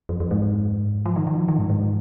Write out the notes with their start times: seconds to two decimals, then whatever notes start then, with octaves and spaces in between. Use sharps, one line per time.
0.09 F2
0.20 F2
0.31 G#2
1.06 F3
1.16 D#3
1.27 D#3
1.37 F3
1.48 D#3
1.59 G#2
1.70 G#2